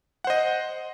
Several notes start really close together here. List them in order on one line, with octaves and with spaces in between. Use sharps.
F#5 C5 D#5